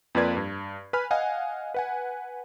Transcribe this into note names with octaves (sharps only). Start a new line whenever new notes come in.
F2 A#3 F4 B4 D5 G#6
G2
B4 G#5 B5 F6
D#5 F5 F#5 G#5
B4 F#5 G#5